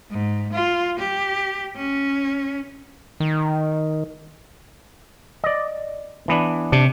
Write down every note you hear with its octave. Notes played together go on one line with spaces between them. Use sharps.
G#2
F4
G4
C#4
D#3
D5 D#5
E3 B3 D4
C3 D4